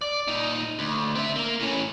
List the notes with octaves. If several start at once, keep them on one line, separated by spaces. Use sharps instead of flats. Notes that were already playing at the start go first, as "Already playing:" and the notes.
D5
A#2 D#4
D2
C4 E5
A#3
A2 C#4